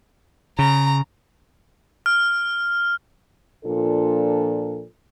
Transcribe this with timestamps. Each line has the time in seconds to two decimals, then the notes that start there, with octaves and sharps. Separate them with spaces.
0.59 C#3 A#5
2.06 F6
3.65 A#2 F3 D4 A4